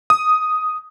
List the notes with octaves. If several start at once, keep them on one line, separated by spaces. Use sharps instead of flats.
D#6